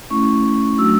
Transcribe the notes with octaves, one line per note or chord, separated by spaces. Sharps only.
A3 C#4 E4 C#6
F#3 A3 D4 F#4 E6